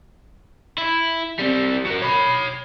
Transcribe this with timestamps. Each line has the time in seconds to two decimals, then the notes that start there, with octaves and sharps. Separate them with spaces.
0.78 E4
1.40 G3 C4
1.86 F#3 A#4
2.02 C#5 B5